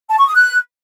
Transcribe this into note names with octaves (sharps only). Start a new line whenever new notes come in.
A5
C#6
D#6
F#6